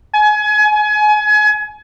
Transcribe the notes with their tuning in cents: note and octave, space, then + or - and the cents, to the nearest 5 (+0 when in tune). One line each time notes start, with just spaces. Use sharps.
G#5 +30